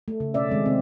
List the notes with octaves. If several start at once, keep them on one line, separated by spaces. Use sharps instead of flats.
A3
C#3
B2 C#4 D5 E5
D#3 G#3 C4
C3 C4